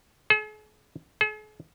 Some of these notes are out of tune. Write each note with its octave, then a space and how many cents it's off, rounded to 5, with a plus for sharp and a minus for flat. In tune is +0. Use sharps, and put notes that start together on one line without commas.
G#4 +45
G#4 +45